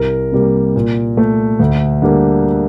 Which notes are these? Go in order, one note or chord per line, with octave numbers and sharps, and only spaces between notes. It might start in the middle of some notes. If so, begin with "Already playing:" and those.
Already playing: C2 A#4
C3 G3 A#3
A#2
A3
D2
D3 G3 A#3